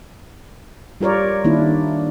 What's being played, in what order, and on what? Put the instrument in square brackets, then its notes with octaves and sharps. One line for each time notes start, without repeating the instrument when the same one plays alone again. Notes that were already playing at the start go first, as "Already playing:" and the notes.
[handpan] G3 F4 A#4 C#5 D5
D#3 A#3 D4 E4